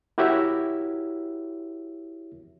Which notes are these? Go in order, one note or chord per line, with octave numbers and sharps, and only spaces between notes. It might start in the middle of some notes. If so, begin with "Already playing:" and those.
E4 F#4 G4 A#4 C#5 E5